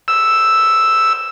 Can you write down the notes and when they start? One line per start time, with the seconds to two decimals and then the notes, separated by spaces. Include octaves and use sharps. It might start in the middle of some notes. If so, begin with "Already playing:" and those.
0.08 E6